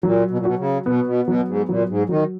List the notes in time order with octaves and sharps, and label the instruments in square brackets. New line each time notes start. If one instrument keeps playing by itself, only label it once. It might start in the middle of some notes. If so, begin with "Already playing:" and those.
[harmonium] A#2 [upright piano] F#3
[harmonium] B2
A#2
[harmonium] B2 [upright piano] F#4
[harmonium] C#3
[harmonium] B2 [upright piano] B3
[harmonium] B2
[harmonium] B2 [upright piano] F#3
[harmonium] G#2
[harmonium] A#2 [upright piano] F#3
[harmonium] G#2
[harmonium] D#3 [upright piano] F#3